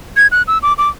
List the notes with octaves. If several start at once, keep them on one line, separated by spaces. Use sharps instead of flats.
G#6
F#6
E6
D6
D6